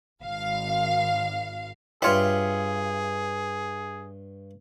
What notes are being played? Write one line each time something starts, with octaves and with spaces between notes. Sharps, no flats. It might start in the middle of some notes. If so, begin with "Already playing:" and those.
G#1 F5
G2 G3 F4 G#4 C#5 E5